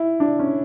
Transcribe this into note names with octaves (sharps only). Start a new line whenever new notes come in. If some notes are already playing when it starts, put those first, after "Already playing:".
Already playing: E4
D4
C#4